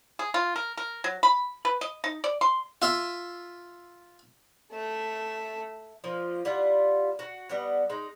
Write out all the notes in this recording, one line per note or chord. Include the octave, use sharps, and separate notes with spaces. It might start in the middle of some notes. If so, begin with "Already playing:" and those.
G#4
F4
A#4
A#4
F#3
B5
B4
D#5
D#4
D5
C6
F4 E5
A3 E5
F3 A#3 F4
G3 E4 F4 F#5
F#4
G3 B3 D#5 F#5
G#3 D#4